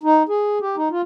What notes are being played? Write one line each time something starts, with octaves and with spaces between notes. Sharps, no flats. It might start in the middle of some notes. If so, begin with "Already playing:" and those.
D#4
G#4
G4
D#4
F4